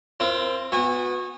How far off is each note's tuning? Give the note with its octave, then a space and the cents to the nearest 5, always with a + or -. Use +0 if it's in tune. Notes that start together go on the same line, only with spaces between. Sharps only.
C4 +10 F4 -35 A#4 +20
B3 +5 F#4 -25 G#5 -30